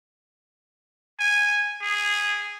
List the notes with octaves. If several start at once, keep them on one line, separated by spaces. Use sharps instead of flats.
G#5
G#4